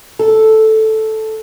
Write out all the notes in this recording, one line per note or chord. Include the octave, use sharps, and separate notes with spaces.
A4